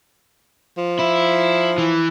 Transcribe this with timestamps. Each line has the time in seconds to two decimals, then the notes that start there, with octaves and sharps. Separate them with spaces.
0.78 F3
0.99 E4
1.78 E3